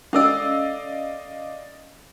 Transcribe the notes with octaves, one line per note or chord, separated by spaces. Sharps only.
C#4 A4 D5 D#5 F5 E6